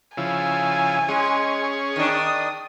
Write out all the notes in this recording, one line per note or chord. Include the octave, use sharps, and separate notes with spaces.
C#3 F3 E4 G#5
G#3 C#4 G#4
D#3 D4 D#6